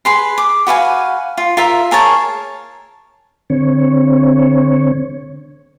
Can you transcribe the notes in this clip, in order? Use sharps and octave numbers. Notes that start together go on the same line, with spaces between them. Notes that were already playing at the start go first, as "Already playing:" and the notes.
G#4 B4 C6
D6
F#4 B4 F5 G#5
F4
F4 A#4 E5
G#4 A#4 C#5 A5
D3 C4 C#5